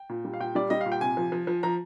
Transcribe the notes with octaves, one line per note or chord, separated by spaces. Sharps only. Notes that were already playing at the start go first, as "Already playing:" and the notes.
Already playing: G5
A#2
G3
F5
A#2 G5
G3 D5
G3 D#5
F5
A#2
G5
C3 G#5
F3
F3
F3
F3 A#5